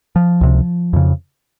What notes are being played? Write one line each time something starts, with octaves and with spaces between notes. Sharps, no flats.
F3
C#2 C3
F2 C#3